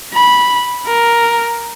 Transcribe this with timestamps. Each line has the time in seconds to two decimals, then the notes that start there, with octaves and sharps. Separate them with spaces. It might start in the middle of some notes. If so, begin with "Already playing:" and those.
0.13 B5
0.86 A#4